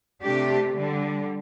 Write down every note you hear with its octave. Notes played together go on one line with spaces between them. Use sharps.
C3 A3 D4 G4
D3 G3